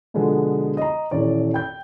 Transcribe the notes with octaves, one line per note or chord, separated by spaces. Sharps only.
B2 D3 F3 G#3 B3
D#5 A#5
D#1 E3 C#5 D5
G5 G6